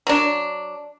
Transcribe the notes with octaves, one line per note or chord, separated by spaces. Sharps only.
F#3 D4